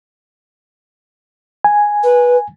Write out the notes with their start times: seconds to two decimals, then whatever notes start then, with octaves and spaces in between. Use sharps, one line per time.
1.64 G#5
2.03 B4